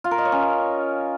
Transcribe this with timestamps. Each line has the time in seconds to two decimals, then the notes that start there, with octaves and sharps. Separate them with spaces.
0.04 F4
0.11 A#4
0.18 D#5
0.25 C#5
0.32 C#4